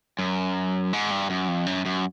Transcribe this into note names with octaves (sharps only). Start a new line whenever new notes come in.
F#2
G#2
G2
F#2
F2
F#2
F#2